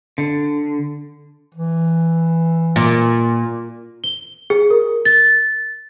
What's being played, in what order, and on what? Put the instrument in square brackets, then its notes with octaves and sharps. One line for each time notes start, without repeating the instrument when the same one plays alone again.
[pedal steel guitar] D3
[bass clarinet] E3
[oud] A#2
[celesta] G7
G#4
A#4
A6